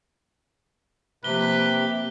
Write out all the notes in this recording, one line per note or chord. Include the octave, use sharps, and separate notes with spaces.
C3 F3 A#3 G4 B4 G7